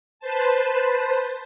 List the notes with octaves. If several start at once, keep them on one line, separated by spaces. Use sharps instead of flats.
B4 C5 A5